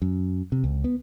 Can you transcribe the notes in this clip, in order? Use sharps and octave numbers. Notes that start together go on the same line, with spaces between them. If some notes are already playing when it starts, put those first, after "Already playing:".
F#2
C3
C#2
B3